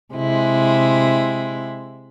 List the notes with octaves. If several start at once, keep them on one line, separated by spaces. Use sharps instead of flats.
C3 G#3 E4